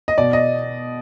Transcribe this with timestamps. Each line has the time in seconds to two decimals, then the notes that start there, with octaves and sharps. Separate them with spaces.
0.08 D#5
0.18 B2 D5
0.33 D#5